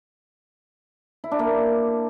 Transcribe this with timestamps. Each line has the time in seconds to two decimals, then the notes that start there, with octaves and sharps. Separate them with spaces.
1.24 E4
1.31 D4
1.39 A#3